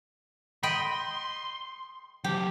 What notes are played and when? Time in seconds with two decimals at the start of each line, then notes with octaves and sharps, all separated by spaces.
0.63 D#5 G5 B5 C6
2.24 F#3 G4 C5